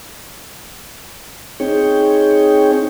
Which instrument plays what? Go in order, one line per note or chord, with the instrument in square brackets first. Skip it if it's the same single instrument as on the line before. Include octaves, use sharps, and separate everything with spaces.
[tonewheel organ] C4 D#4 G#4 C#5 G5